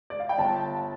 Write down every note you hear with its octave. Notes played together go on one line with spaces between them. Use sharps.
D5
F5
G5
G1 A5